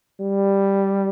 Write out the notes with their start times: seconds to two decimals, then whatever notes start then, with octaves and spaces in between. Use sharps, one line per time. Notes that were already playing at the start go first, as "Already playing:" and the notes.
0.20 G3